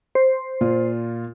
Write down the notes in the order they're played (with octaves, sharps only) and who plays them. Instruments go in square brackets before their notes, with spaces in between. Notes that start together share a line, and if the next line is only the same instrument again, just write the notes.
[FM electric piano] C5
[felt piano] A#2 F4